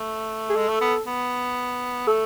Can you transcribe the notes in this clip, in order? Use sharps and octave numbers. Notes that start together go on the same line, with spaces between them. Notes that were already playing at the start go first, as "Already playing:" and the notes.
Already playing: A3
G#4
G#3 A4
A3
B3
B3
A3 A4